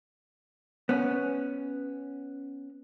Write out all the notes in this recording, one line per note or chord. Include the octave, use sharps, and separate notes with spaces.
B3 C#4